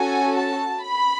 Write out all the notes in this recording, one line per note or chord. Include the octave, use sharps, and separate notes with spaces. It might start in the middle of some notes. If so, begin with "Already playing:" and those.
Already playing: C#4 F#4 A4 G#5
A5
B5